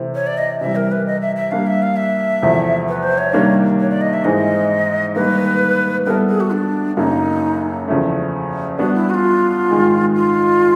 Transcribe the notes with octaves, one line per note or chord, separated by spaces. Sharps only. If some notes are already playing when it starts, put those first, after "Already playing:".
Already playing: C3 E3 A3 C4 E4
C#5
D5
D#5
C3 E3 G3 E5
A#4
B4
D#5
E5
E5
G3 A#3 D4 F5
E5
F5
E5
E2 C3 F3 A3
B4
C5
C#5
C3 D#3 G3 A#3 D4
C#5
D5
D#5
E5
G#2 E3 G#3 C4 D#5
D#3 G3 A#3 B4
G3 B3 E4 A4 A#4
G#4
F#4
D4
F#2 C#3 F#3 A#3 D4 D#4
E2 C#3 F3 A3
G3 B3 D4 F#4
E4
F#4
F4
G#2 D#3 G#3
F4